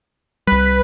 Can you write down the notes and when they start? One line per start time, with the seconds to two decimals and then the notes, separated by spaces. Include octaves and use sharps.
0.47 C2 G3 B4